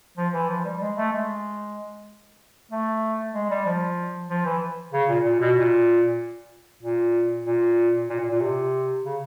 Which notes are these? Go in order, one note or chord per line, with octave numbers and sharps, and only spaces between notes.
F3
E3
F3
G3
G#3
A3
G#3
A3
G#3
G3
F3
F3
E3
C#3
A#2
A#2
B2
A#2
A#2
A#2
A#2
A#2
A#2
C3
C#3